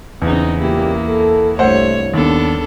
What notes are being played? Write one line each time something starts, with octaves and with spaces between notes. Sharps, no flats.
E2 C#3 C4 D#4
C#2 A#2 A#3 E4 G4
A4
C2 G2 A3 C5 C#5 F#5
D#2 B3 D4 A4